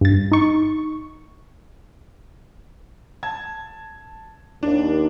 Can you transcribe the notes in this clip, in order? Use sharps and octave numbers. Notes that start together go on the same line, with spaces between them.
G2 A6
D#4 C#6
A5 G#6
D#2 D4